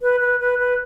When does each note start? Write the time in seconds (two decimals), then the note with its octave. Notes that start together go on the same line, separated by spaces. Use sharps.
0.02 B4
0.20 B4
0.40 B4
0.59 B4